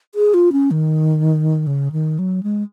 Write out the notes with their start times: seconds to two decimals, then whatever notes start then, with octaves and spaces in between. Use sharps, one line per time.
0.15 G#4
0.34 F4
0.52 C#4
0.71 D#3
1.67 C#3
1.92 D#3
2.19 F#3
2.43 G#3